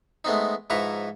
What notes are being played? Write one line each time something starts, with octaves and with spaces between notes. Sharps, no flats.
G#3 A3 B3 C4 D#4
G#2 F3 E4 B4 A#5 C#6